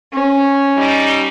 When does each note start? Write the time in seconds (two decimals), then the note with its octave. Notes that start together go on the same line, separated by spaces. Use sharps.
0.13 C#4
0.77 G3 D#4